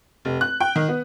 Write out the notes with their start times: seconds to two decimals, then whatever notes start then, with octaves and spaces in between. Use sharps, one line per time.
0.25 F1
0.41 F#6
0.60 G5
0.76 D#3
0.88 B3